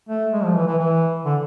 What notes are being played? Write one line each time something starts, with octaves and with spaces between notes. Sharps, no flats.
A3
G#3
F3
E3
E3
E3
D3